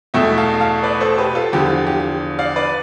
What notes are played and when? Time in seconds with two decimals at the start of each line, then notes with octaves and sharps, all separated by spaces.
0.14 E2 B2 A3 E5 G5
0.38 F5 A5
0.60 F5 A5
0.83 B4 D5
1.00 A4 C5
1.17 G4 B4
1.35 F4 A4
1.52 E2 D3 F3 G4
1.70 F4
1.87 G4
2.39 D5 F5
2.56 B4 D5